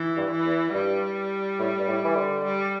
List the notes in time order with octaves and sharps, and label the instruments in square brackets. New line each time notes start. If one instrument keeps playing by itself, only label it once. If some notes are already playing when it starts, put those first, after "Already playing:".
Already playing: [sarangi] E3
[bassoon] G2
[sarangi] E3
[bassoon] E2
[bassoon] G2 [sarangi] G3
[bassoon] A2
G2
A2
E3
D3
[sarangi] G3